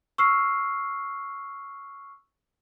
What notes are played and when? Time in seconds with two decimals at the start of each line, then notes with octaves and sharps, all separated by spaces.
0.18 C#6 E6 F6 C7